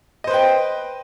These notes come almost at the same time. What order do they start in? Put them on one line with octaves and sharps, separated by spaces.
D#5 C5 B4 G5